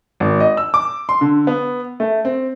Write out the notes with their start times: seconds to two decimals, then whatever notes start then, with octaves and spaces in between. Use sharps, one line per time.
0.20 G#1
0.40 D#5
0.57 E6
0.74 D6
1.09 C6
1.21 D3
1.47 B3
2.00 A3
2.25 C4